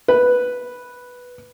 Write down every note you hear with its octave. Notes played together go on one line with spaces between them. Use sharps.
B4